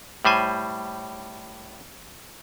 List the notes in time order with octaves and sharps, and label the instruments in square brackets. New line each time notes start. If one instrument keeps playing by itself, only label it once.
[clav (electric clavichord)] A2 G3 C5 G#5